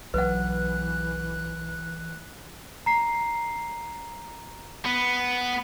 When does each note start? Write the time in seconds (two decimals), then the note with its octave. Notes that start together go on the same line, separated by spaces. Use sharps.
0.14 B1 E3 F#3 B4 F#5 F#6
2.86 A#5 C7
4.85 B3